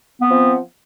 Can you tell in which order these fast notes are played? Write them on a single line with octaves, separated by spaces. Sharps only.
B3 C4 F3